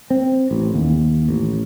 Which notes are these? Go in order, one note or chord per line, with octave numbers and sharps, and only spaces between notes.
C4
A1
D#2
A1